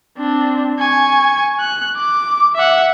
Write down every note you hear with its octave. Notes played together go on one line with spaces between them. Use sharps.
C4 D4
G#5 C#6
F#6
D6
E5 F#5